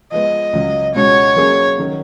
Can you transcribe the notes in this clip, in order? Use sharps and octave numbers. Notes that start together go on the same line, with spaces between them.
F3 G#3 B3 D#5
C#2 C#3 F#3
C#2 B2 G#3 C#4 F#4 C#5
F#3 A#3 C#4 G#4
D#3 F#3 C#4